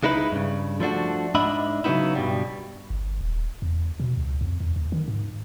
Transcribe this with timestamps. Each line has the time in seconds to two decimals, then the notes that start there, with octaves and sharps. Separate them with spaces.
0.03 C#2 G#3 D#4 E4 B4
0.32 G2 C#3
0.80 F3 A3 D4 F#4
1.35 G#2 D4 D#5 E5 B5
1.84 C#3 F#3 G#3 B3 D#4 E4
2.15 G2 B2 G3
2.90 G1
3.21 D#1
3.62 E2
4.00 B2
4.17 C#2
4.41 F2
4.60 E2
4.76 D#2
4.92 D#3
5.08 G#2